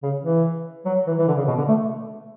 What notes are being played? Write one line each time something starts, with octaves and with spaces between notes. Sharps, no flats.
C#3
E3
F#3
E3
E3
D3
C#3
B2
D3
A3